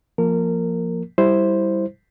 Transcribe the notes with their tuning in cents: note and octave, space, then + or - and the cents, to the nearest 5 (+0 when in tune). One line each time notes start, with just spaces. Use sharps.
F3 +0 A#3 +5 A#4 -20
G3 +0 E4 +0 C5 +0